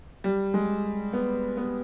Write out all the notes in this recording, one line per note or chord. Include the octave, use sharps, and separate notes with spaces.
G3
G#3
B3
B3